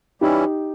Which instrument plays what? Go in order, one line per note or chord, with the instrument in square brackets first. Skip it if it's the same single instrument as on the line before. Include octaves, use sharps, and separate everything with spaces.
[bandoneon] E3 G3 C#4 E4 [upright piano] D#4 G4